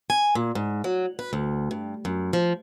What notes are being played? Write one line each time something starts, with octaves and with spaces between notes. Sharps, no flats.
G#5
A#2
G#2
F#3
B4
D2
G2
F#2
F3